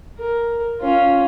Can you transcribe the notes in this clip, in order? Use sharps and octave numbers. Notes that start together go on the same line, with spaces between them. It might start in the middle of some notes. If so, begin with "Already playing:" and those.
A#4
C#4 F4